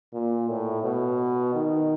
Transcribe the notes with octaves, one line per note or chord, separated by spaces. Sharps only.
A#2
A2
B2
D#3